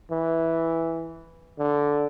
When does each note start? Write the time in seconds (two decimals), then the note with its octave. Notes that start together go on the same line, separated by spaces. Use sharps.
0.11 E3
1.59 D3